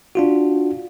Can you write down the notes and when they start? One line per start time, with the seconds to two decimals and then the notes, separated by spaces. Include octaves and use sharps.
0.15 D4 F4 F#4